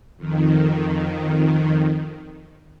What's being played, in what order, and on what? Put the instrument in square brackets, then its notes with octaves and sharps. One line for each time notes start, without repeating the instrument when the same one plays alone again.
[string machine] F2 D#3